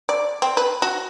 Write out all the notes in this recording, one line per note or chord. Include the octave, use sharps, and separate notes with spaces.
D5
C4
B4
F#4